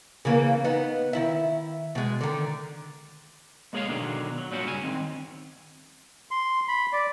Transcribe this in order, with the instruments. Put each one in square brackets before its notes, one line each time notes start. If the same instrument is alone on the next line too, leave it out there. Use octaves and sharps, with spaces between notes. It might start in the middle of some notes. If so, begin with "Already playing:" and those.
[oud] C#3 E3 A#3
B3 D#4
D#3 E4 E5
B2 G#3
D3 D#3
[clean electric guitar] G#3 A#3 G#4 C#5 D#5 F5
B2 D3 D#3 F#3 D4 G#4
F#3
A#2 F#3 G3 C#4 F#4
G2 C#3 G4 G#5
D#3 C4
[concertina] C6
B5
D5